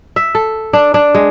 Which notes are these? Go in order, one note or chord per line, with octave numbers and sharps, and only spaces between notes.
E5
A4
D4
D4
G#3